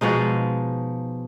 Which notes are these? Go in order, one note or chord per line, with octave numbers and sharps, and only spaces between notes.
B2 F3 G#3 D#4